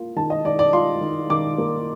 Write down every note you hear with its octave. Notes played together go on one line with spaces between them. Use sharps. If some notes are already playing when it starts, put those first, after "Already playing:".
Already playing: A#3 F4
D#3 A5
D#5
D#3 D5
D5
F4 C6
D#3
D#3 D6
A#3